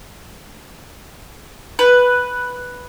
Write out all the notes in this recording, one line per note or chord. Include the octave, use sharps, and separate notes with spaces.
B4